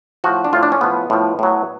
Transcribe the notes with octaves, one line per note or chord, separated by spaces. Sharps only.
A2 F3 F#4
D4
A2 F3 F4
D4
C#4
A2 F3 B3
A2 F3
A2 F#3